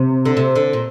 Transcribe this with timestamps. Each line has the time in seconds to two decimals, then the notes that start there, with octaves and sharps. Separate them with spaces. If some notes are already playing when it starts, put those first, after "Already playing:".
Already playing: C3
0.25 D3
0.37 C3
0.56 D3
0.73 A#2